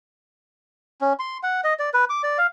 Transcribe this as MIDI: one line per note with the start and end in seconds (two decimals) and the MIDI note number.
1.01 1.13 61
1.19 1.38 84
1.43 1.61 78
1.64 1.74 75
1.79 1.90 74
1.94 2.05 71
2.10 2.22 86
2.23 2.38 74
2.38 2.47 77